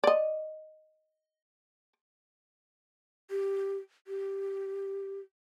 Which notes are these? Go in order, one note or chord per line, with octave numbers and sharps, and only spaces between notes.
D5 D#5
G4
G4